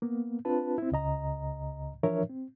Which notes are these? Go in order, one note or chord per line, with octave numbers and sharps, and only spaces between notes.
A#3 B3
C4 D4 F4 B4 A5
C4 E4
C#2 C#3 D#5 A#5
E3 F3 D4 A#4 C#5 E5
C4